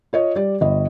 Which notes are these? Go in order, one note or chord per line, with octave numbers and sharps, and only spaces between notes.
F4 C#5 D#5
G3 D5
G1 D#5